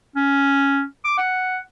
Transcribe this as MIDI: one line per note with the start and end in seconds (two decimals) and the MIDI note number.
0.16 0.83 61
1.04 1.14 86
1.18 1.58 78